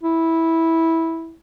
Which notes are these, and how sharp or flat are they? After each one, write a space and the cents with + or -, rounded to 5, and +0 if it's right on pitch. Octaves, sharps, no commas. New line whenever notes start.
E4 -10